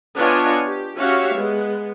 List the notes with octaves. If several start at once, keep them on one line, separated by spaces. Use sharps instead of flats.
B3 D4 F4 C#5 D#5 G#5
G4
C#4 F#4 G4 C#5 E5 F5
G#3 B3